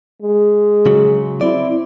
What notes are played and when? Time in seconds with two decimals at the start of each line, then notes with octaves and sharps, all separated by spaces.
0.22 G#3
0.86 C#3 F#3
1.41 C4 E4 D5